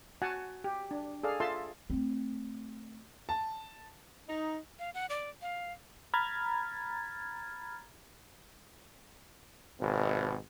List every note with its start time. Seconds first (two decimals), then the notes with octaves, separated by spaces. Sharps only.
0.22 F#4 F#5 G#5 A5
0.64 G4
0.91 D4
1.23 G#4 A4 D5 F5
1.40 F4 A4 E5 A5 C6
1.90 A3 C4
3.29 A5
4.28 D#4
4.79 F5
4.94 F#5
5.10 D5
5.42 F5
6.14 A#5 B5 F6 G#6 A6
9.80 G#1 B2